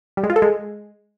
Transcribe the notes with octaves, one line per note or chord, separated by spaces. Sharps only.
G3
G#3
F4
A4
G#3